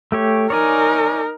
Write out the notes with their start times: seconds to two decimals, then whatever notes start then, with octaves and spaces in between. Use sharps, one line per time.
0.12 A3 G4 C#5
0.50 D#4 A#4 C#5 D5 G#5